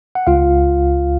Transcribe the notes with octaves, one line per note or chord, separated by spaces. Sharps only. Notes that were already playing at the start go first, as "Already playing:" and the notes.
F#5
C#2 F4 F5